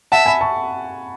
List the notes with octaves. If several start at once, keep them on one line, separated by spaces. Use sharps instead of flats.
E5 F#5 A5
G#5 B5
A5 C#6